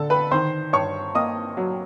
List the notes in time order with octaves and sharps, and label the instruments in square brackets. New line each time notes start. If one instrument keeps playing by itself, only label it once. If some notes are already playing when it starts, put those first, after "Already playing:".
Already playing: [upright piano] D3 A4 A5
B4 B5
D#3 C5 C6
G2 C#5 C#6
A#3 D#5 D#6
F#3